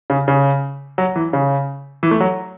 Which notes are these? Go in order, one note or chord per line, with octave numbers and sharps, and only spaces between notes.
C#3
C#3
F#3
E3
C#3
E3
A3
F#3